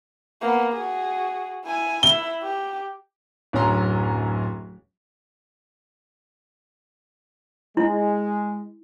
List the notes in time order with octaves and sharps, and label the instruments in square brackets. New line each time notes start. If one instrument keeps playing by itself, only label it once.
[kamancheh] A#3 B3
F#4 G#4
E4 G#5
[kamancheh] E4 E5 [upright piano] G7
[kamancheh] G4
[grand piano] D1 F#2 F#3 C#4 A#5 C6
[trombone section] G#3 [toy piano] E4